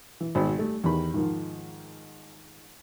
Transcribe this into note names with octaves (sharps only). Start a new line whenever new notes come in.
E3
G#1 B2 C5 B5
G3 A3
E2 D#3 G4 B5
G#2 D#3 F3